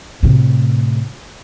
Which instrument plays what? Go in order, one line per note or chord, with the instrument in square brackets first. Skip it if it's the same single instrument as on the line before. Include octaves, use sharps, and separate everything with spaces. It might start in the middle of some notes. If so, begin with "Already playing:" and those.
[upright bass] A2 C3